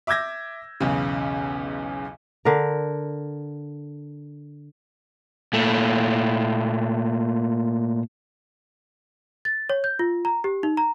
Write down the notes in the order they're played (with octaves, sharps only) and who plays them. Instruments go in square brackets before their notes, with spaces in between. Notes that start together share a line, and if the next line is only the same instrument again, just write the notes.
[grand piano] E5 D6 E6 G6 G#6 A#6
B1 E2 C#3
[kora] D3 A#4
[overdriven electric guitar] A#2 A3
[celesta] A6
C#5
G6
F4
A#5
G4
D#4
A#5